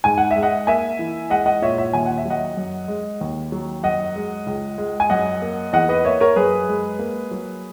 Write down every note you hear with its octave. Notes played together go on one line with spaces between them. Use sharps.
G#2 G#5
F#5
E5
G#3
D#5 F#5
A#3 E5 G#5
E3
G#3 D#5 F#5
D#5 F#5
A#2 C#5 E5
C#5 E5
D#2 G#5
F#5
E5
F#3 D#5 F#5
F#2
G#3
D#2
F#3
F#2 D#5 F#5
G#3
C#2
G#3
G#5
F#2 D#5 F#5
A#3
E2 D#5 F#5
B4 D#5
A#3 C#5 E5
A#4 C#5
F#2 G#4 B4
G#3
A#3
F#3